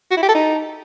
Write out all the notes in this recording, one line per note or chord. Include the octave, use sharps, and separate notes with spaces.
F#4
E4
G4
A4
D#4